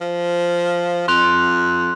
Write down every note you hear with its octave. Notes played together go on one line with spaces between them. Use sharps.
F3
F2 C6 F#6 F7